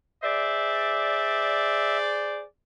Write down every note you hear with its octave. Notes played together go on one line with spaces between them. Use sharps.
G#4 C5 D5 E5